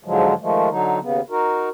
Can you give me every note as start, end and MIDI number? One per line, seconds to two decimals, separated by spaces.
0.04 0.34 44
0.04 0.34 50
0.04 0.34 53
0.04 0.34 54
0.04 0.34 56
0.41 0.69 51
0.41 0.69 53
0.41 0.69 56
0.41 0.69 57
0.70 0.99 50
0.70 0.99 54
0.70 0.99 63
1.01 1.21 39
1.01 1.21 49
1.01 1.21 59
1.30 1.69 63
1.30 1.69 66
1.30 1.69 70